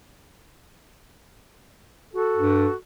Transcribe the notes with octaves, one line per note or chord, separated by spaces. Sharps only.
F#4 A4
G2